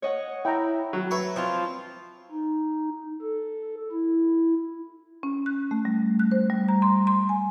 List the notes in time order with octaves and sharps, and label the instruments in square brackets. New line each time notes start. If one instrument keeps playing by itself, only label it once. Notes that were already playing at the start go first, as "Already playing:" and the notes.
[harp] C#5 D#5 F#5
[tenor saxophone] E4 [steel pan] G5 A#5
[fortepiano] F#3
[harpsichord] B4 C#5 E5
[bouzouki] F3 C4 F4
[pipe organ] D#4
A4
E4
[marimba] C#4
F#6
A3
G3
F#6
C5
G3
A#5
C6
C6
G#5